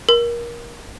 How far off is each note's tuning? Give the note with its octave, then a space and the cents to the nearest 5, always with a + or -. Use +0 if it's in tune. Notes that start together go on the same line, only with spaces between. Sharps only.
A#4 +25